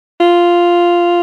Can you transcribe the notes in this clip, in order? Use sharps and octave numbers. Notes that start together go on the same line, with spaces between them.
F4